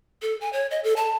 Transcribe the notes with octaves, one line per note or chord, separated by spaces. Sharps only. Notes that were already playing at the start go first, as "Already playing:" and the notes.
A4
G#5
C#5
D#5
A4
A5